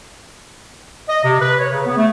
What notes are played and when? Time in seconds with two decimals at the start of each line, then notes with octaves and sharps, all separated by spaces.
1.09 D#5
1.24 C3
1.41 B4
1.59 C#5
1.72 C#3
1.86 B3
1.97 A3